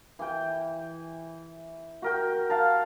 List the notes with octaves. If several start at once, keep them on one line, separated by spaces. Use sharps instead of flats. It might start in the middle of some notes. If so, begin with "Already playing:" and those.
E3 G5
F#4 A#4 G5
F5 A5 A#5